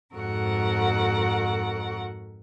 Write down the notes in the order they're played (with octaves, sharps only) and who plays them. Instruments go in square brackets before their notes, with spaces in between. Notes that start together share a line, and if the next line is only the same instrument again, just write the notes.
[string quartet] F2 G#2 F#4 A4 A#4 F#5